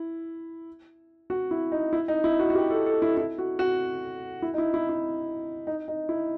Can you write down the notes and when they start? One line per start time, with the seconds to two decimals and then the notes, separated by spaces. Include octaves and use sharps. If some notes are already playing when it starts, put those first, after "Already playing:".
Already playing: E4
1.30 F#4
1.51 E4
1.72 D#4
1.93 E4
2.08 D#4
2.24 E4
2.39 F#4
2.50 F#4
2.55 G4
2.71 A4
2.86 A4
3.02 E4
3.17 E4
3.38 F#4
3.59 F#4
4.42 E4
4.54 D#4
4.58 E4
4.74 E4
4.89 E4
5.67 D#4
5.88 D#4
6.09 E4